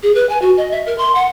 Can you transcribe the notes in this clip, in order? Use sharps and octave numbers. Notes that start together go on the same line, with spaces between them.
G#4
B4
G#5
F#4
D#5
E5
A#4
C6
F#5